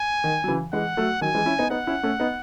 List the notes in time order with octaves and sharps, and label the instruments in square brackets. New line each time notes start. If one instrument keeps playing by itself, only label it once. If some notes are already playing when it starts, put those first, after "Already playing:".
Already playing: [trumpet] G#5
[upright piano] D#3
F#3
C#3 E3
[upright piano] E3 G#3 [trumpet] F#5
[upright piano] F#3 A3
[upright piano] D#3 F#3 [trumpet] G#5
[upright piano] E3 G#3
C#4 E4
B3 D#4
[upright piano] B3 D#4 [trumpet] F#5
[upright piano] C#4 E4
A3 C#4
B3 D#4